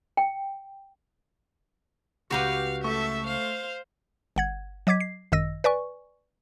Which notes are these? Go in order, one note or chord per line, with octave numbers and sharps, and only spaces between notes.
G5
C#2 C#3 F#4 G4 B4 F5
A3 A4 E5 C#6
C5 F5
G1 F#5 G#6
F#3 D#5 D6 G#6 B6
C7
G#1 F#2 D#3 D#5 E6 A#6
B4 D5 G#5 C#6